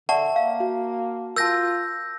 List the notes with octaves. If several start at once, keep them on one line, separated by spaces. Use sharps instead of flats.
D3 D5 E5 F#5 A5 C#6
A#3 F5
F#4
F4 A#4 A5 E6 G6 A#6